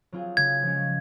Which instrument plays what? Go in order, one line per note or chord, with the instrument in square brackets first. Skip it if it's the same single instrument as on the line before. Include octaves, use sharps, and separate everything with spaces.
[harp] F#3 C4 F4 G#4
[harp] C#3 [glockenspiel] G#6
[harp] F3 G#3 C#4